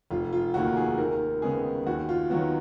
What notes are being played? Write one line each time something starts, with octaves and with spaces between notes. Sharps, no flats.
F1 F4
F4
D#2 D#3 A#3 F#4
G#4
D#2 A#4
C#3 G#3 B3 G#4
D#2 F#4
F4
D#3 F#3 B3 F#4